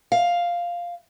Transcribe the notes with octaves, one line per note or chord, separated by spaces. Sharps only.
F5